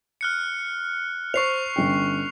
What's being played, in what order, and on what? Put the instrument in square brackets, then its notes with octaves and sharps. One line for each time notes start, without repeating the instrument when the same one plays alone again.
[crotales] F6 F#6 C#7
[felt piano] C5 [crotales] C#6 C7 F7
[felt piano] G1 C#4 G5